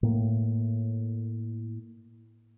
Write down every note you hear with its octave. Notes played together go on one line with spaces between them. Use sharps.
A2 A#3